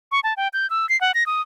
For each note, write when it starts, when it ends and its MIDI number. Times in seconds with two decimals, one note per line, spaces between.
0.12 0.20 85
0.24 0.34 81
0.37 0.48 79
0.53 0.69 91
0.70 0.89 88
0.89 0.99 96
1.01 1.12 78
1.14 1.26 94
1.26 1.41 87